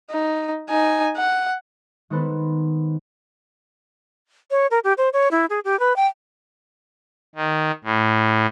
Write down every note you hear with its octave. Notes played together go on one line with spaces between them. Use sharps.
D#4
D#4 G#5
F#5
D#3 G#3 B3 A4 B4 C5
C#5
A#4
G4
C5
C#5
E4
G#4
G4
B4
G5
D#3
A2